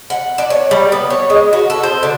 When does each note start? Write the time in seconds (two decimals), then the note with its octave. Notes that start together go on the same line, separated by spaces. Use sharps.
0.10 F#5
0.38 D5
0.50 C#5
0.71 G3
0.92 B3
1.10 C#5
1.30 G#3
1.53 F#4
1.70 A4
1.83 C5
2.03 D3